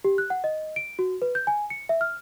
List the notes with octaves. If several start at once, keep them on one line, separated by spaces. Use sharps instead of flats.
G4
F#6
F#5
D#5
D7
F#4
B4
G6
G#5
C#7
E5
F6